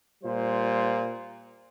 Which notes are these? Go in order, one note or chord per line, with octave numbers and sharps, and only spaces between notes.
A#2 G3 F4 C5